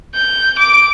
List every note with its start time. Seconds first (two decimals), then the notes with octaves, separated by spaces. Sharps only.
0.15 G6
0.59 D6 D7